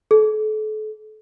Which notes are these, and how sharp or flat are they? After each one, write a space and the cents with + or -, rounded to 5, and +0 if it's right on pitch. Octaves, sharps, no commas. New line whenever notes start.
A4 -35